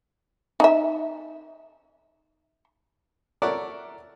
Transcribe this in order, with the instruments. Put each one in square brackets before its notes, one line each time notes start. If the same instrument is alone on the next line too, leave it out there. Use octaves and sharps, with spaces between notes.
[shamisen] D#4 E5
[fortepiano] A4 A#4 C#5 D5 E5 F#5